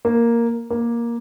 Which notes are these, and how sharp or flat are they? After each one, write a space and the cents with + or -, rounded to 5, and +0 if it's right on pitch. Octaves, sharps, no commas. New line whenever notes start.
A#3 +0
A#3 +10